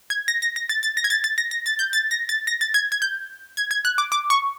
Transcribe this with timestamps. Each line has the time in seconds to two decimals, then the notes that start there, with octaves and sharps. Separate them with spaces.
0.10 G#6
0.28 A#6
0.42 A#6
0.56 A#6
0.69 A6
0.83 A6
0.97 A#6
1.04 G#6
1.10 A6
1.24 A6
1.38 A#6
1.51 A#6
1.66 A6
1.79 G6
1.93 A6
2.11 A#6
2.29 A6
2.47 A#6
2.61 A6
2.74 G#6
2.92 G#6
3.02 G6
3.57 G#6
3.71 G#6
3.85 F#6
3.98 D6
4.12 D6
4.30 C#6